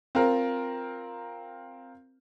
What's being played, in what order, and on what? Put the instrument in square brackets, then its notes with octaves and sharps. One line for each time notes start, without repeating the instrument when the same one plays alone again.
[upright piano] C4 F4 A#4